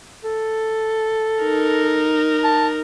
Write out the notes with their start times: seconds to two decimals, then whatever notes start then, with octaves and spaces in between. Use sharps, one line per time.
0.24 A4
1.44 D#4 A#4
2.44 A5